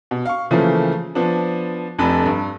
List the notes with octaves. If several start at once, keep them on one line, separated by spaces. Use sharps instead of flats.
B2
F5 C#6
C#3 E3 F3 A3 A#3
F3 B3 D4
F1 F2 D4 A4 B5
G2